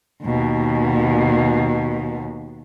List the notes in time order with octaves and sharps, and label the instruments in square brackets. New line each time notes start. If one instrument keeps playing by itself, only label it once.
[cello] D#2 B2